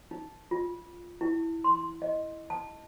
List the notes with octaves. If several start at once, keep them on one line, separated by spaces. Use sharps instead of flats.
D#4
F4
E4
C6
D#5
A5